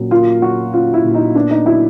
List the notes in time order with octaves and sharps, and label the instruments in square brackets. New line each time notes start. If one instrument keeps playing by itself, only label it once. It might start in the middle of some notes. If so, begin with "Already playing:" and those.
Already playing: [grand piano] A#2 F#3 C#4
[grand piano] A#3 [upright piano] F4
[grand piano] F#3 [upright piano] F#4
[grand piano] C#4 [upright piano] F4
[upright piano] E4
[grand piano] A#2
[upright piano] D#4
[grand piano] B3 [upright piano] D4
[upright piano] D#4
[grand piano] F#3 [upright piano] E4